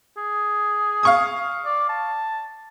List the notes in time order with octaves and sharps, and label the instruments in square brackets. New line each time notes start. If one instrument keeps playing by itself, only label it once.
[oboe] G#4
[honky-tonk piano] F5 C#6 D#6
[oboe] D5
A5